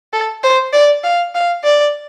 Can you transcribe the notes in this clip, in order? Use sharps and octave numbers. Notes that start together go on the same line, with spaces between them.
A4
C5
D5
F5
F5
D5